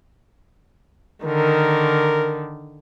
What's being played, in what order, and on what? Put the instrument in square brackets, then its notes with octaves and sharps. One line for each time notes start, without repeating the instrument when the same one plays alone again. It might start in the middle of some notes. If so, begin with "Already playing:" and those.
[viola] D3 D#3 [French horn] A#4